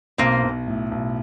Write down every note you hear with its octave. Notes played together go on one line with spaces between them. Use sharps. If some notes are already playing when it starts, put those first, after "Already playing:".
B1 A#3 C4
B1
A2
B1